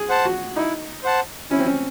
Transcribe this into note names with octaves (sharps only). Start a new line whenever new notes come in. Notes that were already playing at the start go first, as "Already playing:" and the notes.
Already playing: G#4
C5 F#5 A5
F#4
D#4 E4
C5 F#5 A5
C#4 E4
C4
C#4